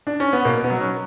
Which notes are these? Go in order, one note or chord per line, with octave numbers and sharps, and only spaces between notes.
D4
C#4
B3
B2 A#3
B3
F#3
C#4